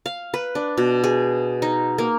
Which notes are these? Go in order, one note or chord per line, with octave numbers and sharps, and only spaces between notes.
F5
B4
D4
B2
G#4
D#4
A#3